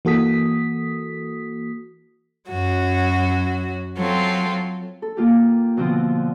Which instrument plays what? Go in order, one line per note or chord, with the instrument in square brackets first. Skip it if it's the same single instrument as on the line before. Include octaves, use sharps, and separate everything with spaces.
[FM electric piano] E3 A#3 F#4 A4 D#6 B6
[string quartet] F#2 F#3 F#4
F#3 C4 F4 A4
[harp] A4
A#3 F4 G4
B2 D3 F3 B3 C4 F4